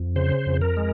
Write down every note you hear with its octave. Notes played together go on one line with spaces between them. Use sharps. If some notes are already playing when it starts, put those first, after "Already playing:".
Already playing: F2
C#3 C5
F2
A#4
G#3